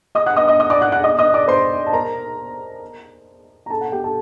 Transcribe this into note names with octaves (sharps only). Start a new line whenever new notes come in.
D#5 D#6
F#5 F#6
D#5 D#6
D#5 D#6
D#5 D#6
D5 D6
F#5 F#6
F#5 F#6
D#5 D#6
D#5 D#6
D5 D6
C5 C6
A5
A#4 A#5
A#5
A4 A5
F#5
G4 G5
A4 A5